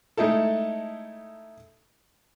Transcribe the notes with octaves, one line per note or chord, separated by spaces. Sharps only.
G#3 A3 D#4 E4 A4